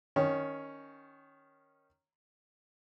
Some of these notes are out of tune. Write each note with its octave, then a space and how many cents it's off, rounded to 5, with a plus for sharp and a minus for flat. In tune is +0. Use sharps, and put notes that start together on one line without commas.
D#3 +0 C#4 +0